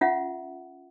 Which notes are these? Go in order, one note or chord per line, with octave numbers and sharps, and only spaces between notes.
C#4 F4 E5 F#5